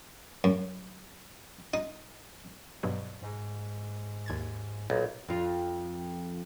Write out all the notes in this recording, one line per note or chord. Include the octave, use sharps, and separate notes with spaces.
F#2
D#4
G2 B2 F#3
G#2
D#2 G#6 A6
B1 A#2
F2 F4